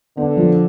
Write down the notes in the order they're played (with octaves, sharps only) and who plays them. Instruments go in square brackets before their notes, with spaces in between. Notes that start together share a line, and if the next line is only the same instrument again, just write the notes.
[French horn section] D3 [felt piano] B3
[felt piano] F3